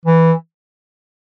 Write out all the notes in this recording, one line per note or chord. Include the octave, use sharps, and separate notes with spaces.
E3